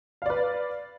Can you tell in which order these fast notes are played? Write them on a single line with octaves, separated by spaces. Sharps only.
F5 D5 B4